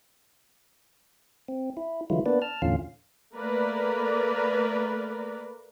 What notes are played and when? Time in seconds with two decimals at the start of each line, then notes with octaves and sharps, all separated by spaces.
1.48 C4
1.77 E4
2.10 D3 E3 F#3 G#3 E4 F4
2.26 A#3 B3 D4 B4 D5
2.42 A5 F6
2.62 E2 A2 D3 C#4 F4 F5
3.34 A3 A#3 A#4 B4 D5